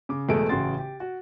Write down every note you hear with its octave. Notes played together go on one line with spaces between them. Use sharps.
C#3 D6
E1 E2 G#3 A3 A4 D7
A1 C#3 F#4 C6 A6
G4
F#4